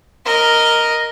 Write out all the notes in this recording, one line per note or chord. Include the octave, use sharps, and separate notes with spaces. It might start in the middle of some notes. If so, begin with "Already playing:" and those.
A#4 D#5